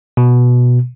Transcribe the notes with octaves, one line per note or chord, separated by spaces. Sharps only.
B2